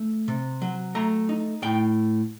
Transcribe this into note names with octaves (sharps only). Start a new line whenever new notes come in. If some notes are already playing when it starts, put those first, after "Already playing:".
Already playing: A3
C3
F#3
A3 A#5
D#4
A2 G5